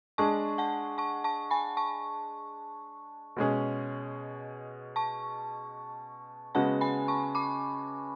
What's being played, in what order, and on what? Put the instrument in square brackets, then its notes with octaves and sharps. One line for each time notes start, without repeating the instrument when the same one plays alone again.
[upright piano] G#3 D4 G#4 [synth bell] A5 C#6
[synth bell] F#5 A5
A5 C#6
A5 C#6
G#5 B5
A5 C#6
[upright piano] B2 G#3 C#4 G#4
[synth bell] A5 C#6
[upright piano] C#3 G#3 B3 F#4 [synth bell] F#5 A5
[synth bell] G#5 B5
A5 C#6
B5 D6